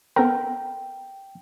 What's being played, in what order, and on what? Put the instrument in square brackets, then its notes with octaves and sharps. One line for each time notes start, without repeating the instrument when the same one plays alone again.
[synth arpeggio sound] B3 A4 A#4 [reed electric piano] G5